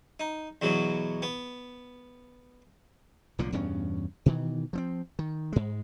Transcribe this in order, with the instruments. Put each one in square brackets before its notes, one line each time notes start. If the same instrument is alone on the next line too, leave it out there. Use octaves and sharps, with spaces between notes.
[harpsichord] D#4
E2 B2 F#3
B3
[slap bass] B1 A#2 D3 F3
E2 G2 B2 C#4
B2 D#3 E3
F3 B3 C4
D#3
G#2 G#3